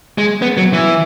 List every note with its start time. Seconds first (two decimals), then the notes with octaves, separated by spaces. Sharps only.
0.18 G#3
0.42 B3
0.57 F#3
0.73 E3